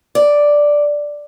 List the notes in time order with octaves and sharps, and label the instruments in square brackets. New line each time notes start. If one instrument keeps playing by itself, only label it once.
[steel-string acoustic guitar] D5